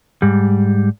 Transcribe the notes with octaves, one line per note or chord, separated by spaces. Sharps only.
G#2 G3